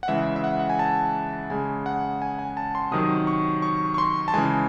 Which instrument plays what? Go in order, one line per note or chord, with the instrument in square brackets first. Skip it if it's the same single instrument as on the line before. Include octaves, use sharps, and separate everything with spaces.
[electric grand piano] F#5
C#3 E3 G#3 E5
E5
F#5
F#5
G#5
A5
C#3 G#3 G#5
F#5
G#5
G#5
A5
C6
C3 D#3 F#3 D#6
C#6
C#6
C#6
C6
A5
C#3 E3 G#3 G#5